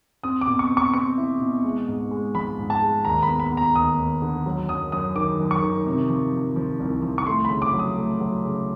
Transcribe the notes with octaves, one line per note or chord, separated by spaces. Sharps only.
C4 D#6
D6
B2
C#6
C4
C#6
C4 C#6
E4
B2
G#3
G#2
G#3
F3 B5
G#2
A5
G#3
D#2 A#5
B5
B3
B5
B3
A#5
D#2 D#6
D#2
D3
F#3
F#2 D#6
F#2 D#6
D#3 D6
F#2
C#6
D#3
C3
F3
F3
F3
C2
F3
C#6
A3 C6
B5
C#3
D6
F#3
D#6
A3
F#3
C#3